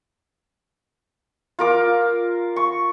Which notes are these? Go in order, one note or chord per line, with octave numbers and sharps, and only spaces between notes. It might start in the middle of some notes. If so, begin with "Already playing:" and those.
F4 A#4 D6
C#6